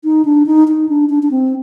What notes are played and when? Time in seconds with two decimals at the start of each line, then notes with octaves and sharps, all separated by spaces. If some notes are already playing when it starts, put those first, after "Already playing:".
0.04 D#4
0.25 D4
0.46 D#4
0.68 D#4
0.89 D4
1.09 D4
1.23 D4
1.31 C4